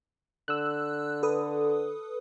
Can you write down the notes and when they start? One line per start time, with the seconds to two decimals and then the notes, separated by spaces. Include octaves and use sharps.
0.48 D3 E6 F#6
1.23 A4 B4 D#6